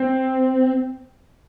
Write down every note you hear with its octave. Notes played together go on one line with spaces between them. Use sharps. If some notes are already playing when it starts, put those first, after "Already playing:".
Already playing: C4